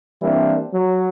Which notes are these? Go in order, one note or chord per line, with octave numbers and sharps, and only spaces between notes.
E3 G3 A#3 C4 D4 E4
F#3